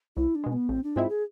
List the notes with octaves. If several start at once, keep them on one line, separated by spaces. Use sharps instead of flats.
C2 E4
D4
B2 G#3
B3
A1 C4
D4
G#2 G#3 C4 E4 F4
G#4